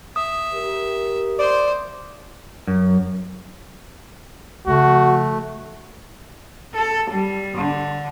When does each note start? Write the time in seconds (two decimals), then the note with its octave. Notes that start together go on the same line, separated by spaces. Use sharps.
0.16 E5 D#6
0.53 G4 A#4
1.39 C5 D5 C6
2.67 F#2
4.67 C#3 F3 A3 F#4
6.75 A4
7.10 G3
7.57 D3